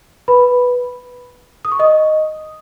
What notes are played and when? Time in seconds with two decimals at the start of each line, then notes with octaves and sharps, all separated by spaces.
0.28 B4 B5
1.65 D#6
1.72 C#6
1.79 D#5 D#6